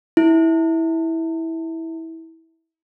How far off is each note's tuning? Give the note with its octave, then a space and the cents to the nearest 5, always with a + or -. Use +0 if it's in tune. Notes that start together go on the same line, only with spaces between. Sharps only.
E4 -15